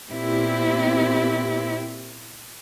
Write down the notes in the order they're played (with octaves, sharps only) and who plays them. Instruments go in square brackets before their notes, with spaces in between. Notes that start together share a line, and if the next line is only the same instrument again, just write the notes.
[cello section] A#2 B3 C4 E4 G4